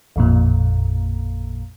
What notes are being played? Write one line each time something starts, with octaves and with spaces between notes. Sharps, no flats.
A1 F2 A#2